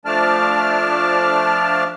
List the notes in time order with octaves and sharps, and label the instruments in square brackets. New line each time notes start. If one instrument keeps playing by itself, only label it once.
[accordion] F3 A3 D4 D5 A5 F6